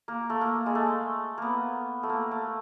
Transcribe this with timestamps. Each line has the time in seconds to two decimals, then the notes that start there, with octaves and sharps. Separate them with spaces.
0.08 A#3
0.30 A3
0.41 A#3
0.66 G#3
0.75 A3
1.38 A#3 B3
2.03 A3
2.09 A#3
2.31 A3